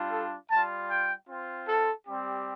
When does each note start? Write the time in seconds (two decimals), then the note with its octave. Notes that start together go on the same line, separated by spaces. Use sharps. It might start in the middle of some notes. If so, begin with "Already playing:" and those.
Already playing: G3 D4 F4
0.12 A4
0.51 G3 F4 A5
0.89 G5
1.28 C4 F4
1.68 A4
2.06 G3 C4 G4